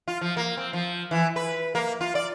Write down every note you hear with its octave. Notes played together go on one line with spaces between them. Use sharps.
F4
F3
A#3
C4
F3
E3
B4
A#3
F4
D5